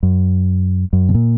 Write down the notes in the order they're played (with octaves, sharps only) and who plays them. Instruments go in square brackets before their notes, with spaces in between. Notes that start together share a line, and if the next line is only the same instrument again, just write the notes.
[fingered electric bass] F#2
F#2
B2
A#2